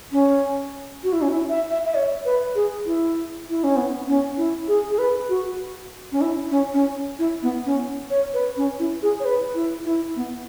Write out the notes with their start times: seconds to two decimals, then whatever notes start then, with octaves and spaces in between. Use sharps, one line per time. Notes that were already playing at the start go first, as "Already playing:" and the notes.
0.12 C#4
1.03 F#4
1.13 E4
1.22 C#4
1.30 E4
1.49 E5
1.71 E5
1.86 E5
1.95 C#5
2.25 B4
2.55 G#4
2.86 E4
3.50 E4
3.64 C#4
3.77 B3
4.08 C#4
4.38 E4
4.68 G#4
4.90 G#4
4.99 B4
5.29 F#4
6.12 C#4
6.21 E4
6.51 C#4
6.74 C#4
7.19 E4
7.43 B3
7.66 C#4
8.10 C#5
8.34 B4
8.57 C#4
8.79 E4
9.03 G#4
9.20 C#5
9.25 B4
9.55 E4
9.85 E4
10.16 B3